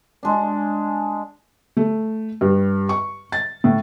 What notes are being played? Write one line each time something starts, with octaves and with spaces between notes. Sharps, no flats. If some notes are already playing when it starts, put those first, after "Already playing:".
G#3 D4
A3
G2
C#6
A6
A2